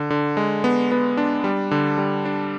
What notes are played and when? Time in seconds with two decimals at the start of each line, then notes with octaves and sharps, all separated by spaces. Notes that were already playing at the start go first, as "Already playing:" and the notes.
Already playing: D3
0.10 D3
0.37 G#3
0.64 B3
0.92 B3
1.17 D4
1.44 G3
1.71 D3
1.98 G3
2.25 D4